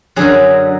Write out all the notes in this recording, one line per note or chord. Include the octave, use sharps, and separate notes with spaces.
F#2 D3 F#3 G#4